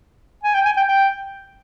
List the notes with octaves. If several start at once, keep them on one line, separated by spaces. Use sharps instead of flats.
G#5
G5
G#5
G5
G5